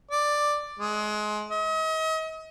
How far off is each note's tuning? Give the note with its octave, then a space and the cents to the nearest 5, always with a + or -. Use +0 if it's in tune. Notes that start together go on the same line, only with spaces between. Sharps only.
D5 +5
G#3 +25
D#5 +40